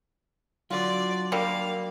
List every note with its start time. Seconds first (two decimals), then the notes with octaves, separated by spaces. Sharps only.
0.70 D3 F#3 F4 F#4 D5
1.32 D3 G3 A#3 F5